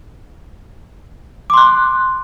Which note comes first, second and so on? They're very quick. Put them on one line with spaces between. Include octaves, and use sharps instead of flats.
D6 C6 F#6